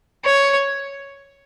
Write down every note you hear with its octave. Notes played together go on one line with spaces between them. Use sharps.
C#5